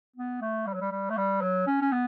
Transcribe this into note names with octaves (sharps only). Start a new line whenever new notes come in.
B3
A3
G3
F#3
G3
G3
A3
G3
F#3
C#4
C#4
B3